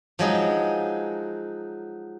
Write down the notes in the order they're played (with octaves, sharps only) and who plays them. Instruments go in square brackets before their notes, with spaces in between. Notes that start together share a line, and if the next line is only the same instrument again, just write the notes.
[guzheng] F3 F#3 G#3 D#4